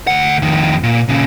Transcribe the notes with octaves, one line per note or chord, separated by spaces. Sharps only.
D2 F#5
F2 D#3
A#2
A#2 C#3